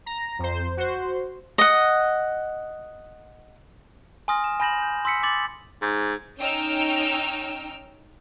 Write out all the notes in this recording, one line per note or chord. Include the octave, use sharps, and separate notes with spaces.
A#5
F2 C5
F#4 C5
D#5 F#5
G#5 C6 D#6 F6 A#6
E7
G#5 B5 G6 A#6 E7 F#7
G6
C6 E6 B6 C#7
D6 A6 F#7
G#2
C#4 D#4 G5 E6 F6